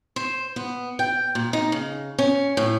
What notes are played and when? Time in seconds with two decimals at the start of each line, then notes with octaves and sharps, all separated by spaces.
0.16 C5
0.56 B3
0.99 G5
1.35 A#2
1.53 D#4
1.72 C#3
2.18 C#4
2.57 A2